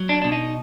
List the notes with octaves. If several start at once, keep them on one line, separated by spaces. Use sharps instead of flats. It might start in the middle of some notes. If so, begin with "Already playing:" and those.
Already playing: F#3
D4
B2 D4
D#4